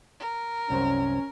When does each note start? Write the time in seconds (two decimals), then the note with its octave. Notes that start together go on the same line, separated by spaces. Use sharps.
0.20 A#4
0.70 C2 F#2 C#4 C5